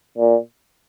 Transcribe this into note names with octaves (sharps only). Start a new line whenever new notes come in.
A#2